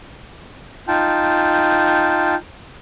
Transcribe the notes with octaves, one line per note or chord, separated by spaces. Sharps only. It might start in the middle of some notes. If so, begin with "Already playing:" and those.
D#4 F4 G5 A5